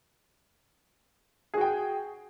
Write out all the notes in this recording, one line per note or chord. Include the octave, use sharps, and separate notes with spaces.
F#4 G#4 G5